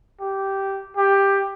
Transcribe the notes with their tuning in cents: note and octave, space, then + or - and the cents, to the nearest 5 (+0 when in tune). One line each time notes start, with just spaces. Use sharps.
G4 -10
G4 +10